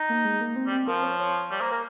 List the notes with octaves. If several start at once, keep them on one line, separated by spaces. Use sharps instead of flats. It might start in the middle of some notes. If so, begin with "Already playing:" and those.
Already playing: D#4
A#3
G#3
A#3
C4
G3
C4
F3 A#4
C#5
C#5
G3 C#5
A#3 C5
A#3 A#4